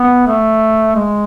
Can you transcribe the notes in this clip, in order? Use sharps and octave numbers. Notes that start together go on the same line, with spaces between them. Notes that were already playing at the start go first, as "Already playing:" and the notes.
Already playing: B3
A3
G#3